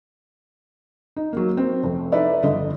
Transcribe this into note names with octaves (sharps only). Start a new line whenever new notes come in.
D#4
F#3 A#3
C4
F1
D#4 E4 A4 B4 D5 E5
G1 D3 D#5